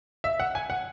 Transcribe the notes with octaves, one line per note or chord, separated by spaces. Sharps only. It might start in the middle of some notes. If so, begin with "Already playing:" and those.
E5
F#5
G#5
F#5